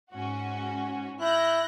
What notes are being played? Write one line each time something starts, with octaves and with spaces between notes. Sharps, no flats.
G#2 C#4 F#4
E4 F#6 G6 A#6